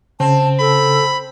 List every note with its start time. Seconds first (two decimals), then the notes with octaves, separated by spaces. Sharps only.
0.20 C#3 C4 A5
0.60 A4 B5